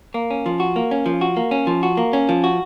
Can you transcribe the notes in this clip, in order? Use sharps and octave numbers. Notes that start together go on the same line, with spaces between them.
A#3
C#4
F3
F#4
A#3
C#4
F3
F#4
A#3
C#4
F3
F#4
A#3
C#4
F3
F#4